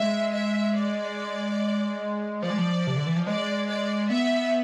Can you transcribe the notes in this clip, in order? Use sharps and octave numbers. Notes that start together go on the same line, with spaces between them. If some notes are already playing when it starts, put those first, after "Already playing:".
Already playing: G#3 E5
E5
D5
F3 D5
G#3
F3
C3
D3
E3
F3
G#3 D5
D5
B3 E5